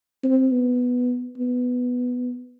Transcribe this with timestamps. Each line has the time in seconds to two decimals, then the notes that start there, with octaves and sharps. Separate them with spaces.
0.24 C4
0.52 B3
1.37 B3